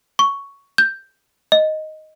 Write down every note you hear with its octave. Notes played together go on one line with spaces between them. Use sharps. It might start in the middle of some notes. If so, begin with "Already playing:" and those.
C#6
G6
D#5